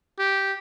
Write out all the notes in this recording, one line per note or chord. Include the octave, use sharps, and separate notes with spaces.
G4